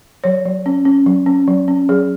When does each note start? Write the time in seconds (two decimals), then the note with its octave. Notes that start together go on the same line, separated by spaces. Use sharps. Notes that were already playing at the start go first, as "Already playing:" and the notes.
0.24 F#3 C#5
0.45 F#3
0.66 C#4
0.85 C#4
1.06 F#3
1.26 C#4
1.48 F#3
1.68 C#4
1.89 F#3 G#4